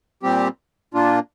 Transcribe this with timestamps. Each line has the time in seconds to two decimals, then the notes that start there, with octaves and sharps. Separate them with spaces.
0.23 A#2 G3 C4 G4
0.94 A#2 A#3 D4 F4